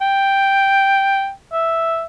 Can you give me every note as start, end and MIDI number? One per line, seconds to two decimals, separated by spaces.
0.01 1.31 79
1.53 2.06 76